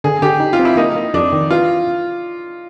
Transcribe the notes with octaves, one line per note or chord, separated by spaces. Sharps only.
D3 G#4
D3 G4
D#4
F4
C4
E4
A#3 D#4
A#3
F2 D4
D#3
E3 F4